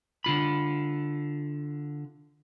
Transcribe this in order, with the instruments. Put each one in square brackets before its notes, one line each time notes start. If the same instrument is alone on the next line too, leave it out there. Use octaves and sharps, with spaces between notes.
[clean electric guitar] D3 F4 B5